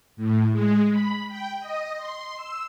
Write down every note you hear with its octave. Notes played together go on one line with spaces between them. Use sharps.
A2
G#3
B5
G5
D#5
C6
E6